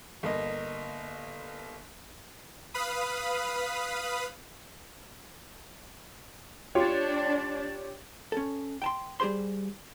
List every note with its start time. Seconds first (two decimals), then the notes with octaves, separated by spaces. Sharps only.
0.23 G1 A#3 D#5
2.74 B4 F5 B5 D#6
6.75 D4 F4 G4 C#5 G5
8.32 C#4 A4
8.82 G5 A5 C6
9.20 G3 G4 G#4 C5 C6